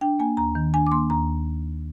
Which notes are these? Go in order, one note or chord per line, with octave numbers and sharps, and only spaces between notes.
D4 G5
A#3 G#5
D#2 A#5
D#3
D4 G#5
D6
A#3 C6
D#2 A#5